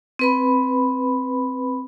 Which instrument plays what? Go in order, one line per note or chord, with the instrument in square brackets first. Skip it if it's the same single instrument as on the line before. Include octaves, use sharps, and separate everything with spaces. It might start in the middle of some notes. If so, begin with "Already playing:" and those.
[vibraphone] C4 B4 B5